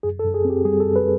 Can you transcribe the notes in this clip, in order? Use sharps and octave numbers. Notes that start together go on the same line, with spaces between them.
F#2 G#4
A4
F#2
G#4
C4 G4
G3 G#4
A4
F#2
B4